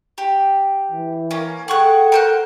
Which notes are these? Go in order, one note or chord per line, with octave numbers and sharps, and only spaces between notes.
G4
E3
A#3 C#4
G#4 A4 F#5 G5 C#6 F#6
A#4 C5 F#6